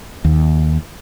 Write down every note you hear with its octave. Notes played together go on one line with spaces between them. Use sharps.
D#2